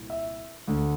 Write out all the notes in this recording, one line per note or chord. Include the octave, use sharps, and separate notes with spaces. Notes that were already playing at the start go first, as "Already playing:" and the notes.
Already playing: C2 A#2
E5
D2 D3